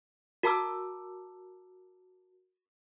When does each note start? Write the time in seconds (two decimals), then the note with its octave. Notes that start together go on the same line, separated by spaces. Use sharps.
0.43 F#4 A#4 A5 A#5 D6 E6